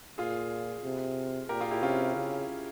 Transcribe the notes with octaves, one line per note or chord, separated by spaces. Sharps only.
A#2 F4 G#4
C3
A#2 G4 A#4
F4 G#4
E4 G4
C3 C#4 F4
C#3